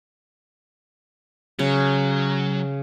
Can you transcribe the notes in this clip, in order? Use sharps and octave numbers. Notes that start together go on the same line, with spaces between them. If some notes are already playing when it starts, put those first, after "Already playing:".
C#3 F#3